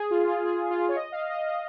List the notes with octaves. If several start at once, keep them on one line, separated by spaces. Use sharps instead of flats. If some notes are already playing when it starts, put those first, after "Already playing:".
Already playing: G#4
F4
F4
G#4
F4
C#5
D#5
F5
D#5
D#5